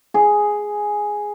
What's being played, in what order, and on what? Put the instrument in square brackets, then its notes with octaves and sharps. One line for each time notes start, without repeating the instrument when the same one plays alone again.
[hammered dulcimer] G#4